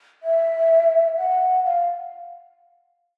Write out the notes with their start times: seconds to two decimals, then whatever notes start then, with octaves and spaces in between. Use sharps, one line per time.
0.23 E5
1.18 F#5
1.65 F5